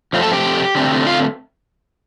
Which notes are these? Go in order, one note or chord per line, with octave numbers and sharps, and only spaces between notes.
F2 F3 A3 C4
A4 A5
G4 G5
D3 A3 C4
F4 F5